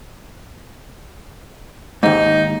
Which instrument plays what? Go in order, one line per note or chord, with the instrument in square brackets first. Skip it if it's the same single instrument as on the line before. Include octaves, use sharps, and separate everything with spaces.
[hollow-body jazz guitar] D#2 G#2 [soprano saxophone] D#4